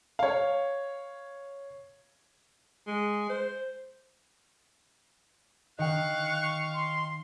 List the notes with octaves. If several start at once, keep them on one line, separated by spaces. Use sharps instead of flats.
C#5 F5
G#3
C5
D#3 D#5 F5 G5 C#6 F#6
C6